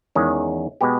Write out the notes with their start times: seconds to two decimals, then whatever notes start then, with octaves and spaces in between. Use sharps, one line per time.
0.15 E2 D#3 G#3 C#4
0.81 B2 G#3 B3 G4